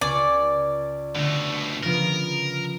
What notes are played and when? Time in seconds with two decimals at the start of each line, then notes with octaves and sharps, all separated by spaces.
0.01 C#2 D5 G#5 C#6
1.16 B2 D3 A3
1.83 C#3 F3 B3 A#4